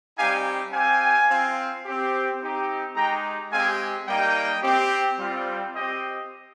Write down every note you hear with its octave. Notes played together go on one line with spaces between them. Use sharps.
G3 C4 D#4 G4 F5 G#5
C4 G4 F5 G#5
C4 F4
C4 G4
C4 D#4 G4
G#3 D#4 G4 G5 A#5
G#3 C4 G4 F5 G#5
G3 A#3 D#4 D#5 G5
C4 G4
G3 C4 F4
C4 G4 D#5 G5